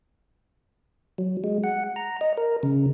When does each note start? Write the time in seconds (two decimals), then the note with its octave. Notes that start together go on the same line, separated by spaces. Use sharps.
1.18 F#3
1.44 G#3
1.64 F#5
1.96 A#5
2.21 D#5
2.37 A#4
2.63 C#3